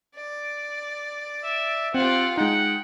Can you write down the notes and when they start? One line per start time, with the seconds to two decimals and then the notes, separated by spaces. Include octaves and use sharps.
0.15 D5
1.44 E5
1.94 C4 F4 G4 F#5
2.37 G#3 D#4 F#5 G5